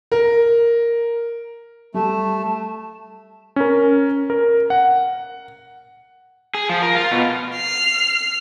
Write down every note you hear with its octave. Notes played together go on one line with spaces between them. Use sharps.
A#4
G3 A3 A5
C#4 A#4
A#4
F#5
G#4
F3
A#4
F4
B2
F6 C7